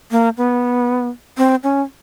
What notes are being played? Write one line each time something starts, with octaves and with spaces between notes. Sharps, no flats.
A#3
B3
C4
C#4